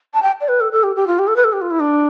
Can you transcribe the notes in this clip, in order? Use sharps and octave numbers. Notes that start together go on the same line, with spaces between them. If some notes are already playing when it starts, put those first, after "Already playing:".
A5
G5
D5
B4
A4
A4
G4
G4
F4
G4
A4
B4
A4
G4
F4
E4
D4